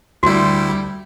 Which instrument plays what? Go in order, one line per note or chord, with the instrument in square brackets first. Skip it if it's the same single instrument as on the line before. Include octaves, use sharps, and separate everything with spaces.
[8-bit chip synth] D2 E4 [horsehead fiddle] G3 [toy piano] F#4